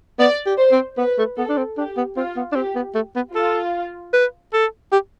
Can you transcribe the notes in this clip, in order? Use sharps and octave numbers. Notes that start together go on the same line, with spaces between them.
B3 D5
G4
C5
C4
B3 B4
A3
B3 A4
D4
C4
D4 G4
B3
C4 F4
B3
D4
C4 G4
B3
A3
B3
F4 A4
B4
A4
G4